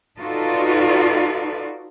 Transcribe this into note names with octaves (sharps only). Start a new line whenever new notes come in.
D#4 F4 F#4 A4 B4 D5